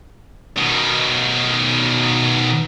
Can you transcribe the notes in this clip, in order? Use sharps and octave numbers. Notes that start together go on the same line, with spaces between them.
B2 D#3